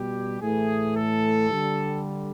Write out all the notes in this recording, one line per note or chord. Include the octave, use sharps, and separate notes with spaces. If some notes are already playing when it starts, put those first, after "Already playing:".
Already playing: B2 G3 G4
A2 E3 A3 G#4
A4
D3 G3